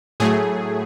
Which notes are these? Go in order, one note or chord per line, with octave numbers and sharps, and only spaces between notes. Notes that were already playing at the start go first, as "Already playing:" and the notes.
A2 F#3 A3 G#4